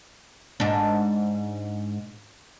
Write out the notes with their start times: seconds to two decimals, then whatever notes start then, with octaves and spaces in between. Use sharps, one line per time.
0.60 G#2 D4